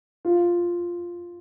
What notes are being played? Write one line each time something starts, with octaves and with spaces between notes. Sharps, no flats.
F4